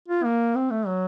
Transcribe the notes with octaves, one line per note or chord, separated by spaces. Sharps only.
F4
A#3
C4
A3
F#3